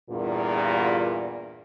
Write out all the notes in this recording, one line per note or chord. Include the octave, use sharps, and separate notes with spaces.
E2 G2 A#2